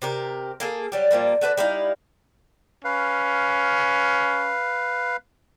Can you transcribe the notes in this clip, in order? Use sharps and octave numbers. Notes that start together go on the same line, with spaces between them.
C3 G4 A#4
A#3 G#4 A4
F#3 G3 G4
A#2 F3 G3 A#3
A3 F#4 B4 D5
G3 D#4 E4 F5
C#4 B4 F5